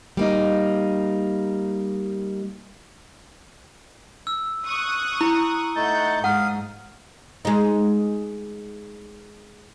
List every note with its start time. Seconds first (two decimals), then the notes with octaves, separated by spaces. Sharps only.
0.17 G3 A#3 D#4
4.27 E6
4.65 C#6 D#6 F#6
5.21 E4 A#5
5.76 A3 D#4 F#5 A5 G6
6.24 G#2 F5 F#5 D#6
7.45 G#3 D#4